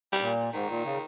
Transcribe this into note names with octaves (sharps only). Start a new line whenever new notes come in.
G3
A#2
G#2 D#3
A#2
C#3